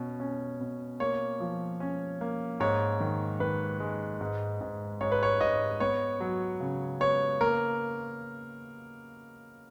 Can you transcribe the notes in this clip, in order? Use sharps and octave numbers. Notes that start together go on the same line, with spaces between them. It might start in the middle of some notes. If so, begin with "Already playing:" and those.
Already playing: B2 C#4
C#4
B2
A#3 C#5
F3
C#4
A#3
G#2 C#5
D#3
D#3 B4
G#3
G#2
G#2
G#2 C#5
B4
C#5
G#2 D#5
B3 C#5
F#3
C#3
B3 C#5
A#3 A#4